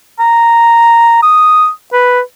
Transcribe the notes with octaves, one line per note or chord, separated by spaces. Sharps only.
A#5
D#6
B4